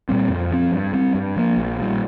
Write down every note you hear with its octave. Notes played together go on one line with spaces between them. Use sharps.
A#2 G3 C4
F2
F3 C4
G2
G3 C4
G2
F3 A#3
A#1
A#2 G3